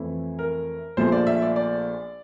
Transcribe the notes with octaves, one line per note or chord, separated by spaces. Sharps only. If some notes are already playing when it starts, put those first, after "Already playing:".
Already playing: F2 E3 A3 E4
A#4
A#1 A#2 F3 A3 C5
D5
E5
D5
D5